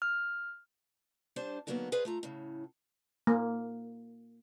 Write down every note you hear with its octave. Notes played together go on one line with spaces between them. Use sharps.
F6
G3 D4 C5
D3 D#3 F#3 A#3 B3
G#4 B4 C5 D5 F5
A3 F4 A#5
A2 C#3
A#3